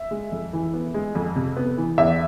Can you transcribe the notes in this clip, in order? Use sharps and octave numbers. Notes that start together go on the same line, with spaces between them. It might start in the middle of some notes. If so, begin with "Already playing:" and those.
Already playing: E5
G#3
F2
E3
B3
G#3
F2
C3
B3
E3
E2 E5